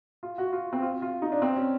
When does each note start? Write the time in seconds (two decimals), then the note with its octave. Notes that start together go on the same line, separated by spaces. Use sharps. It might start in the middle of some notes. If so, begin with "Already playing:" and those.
0.23 F4
0.38 F#4
0.53 F4
0.73 C4
0.82 F4
1.02 F4
1.22 D#4
1.32 D4
1.42 C4
1.57 C#4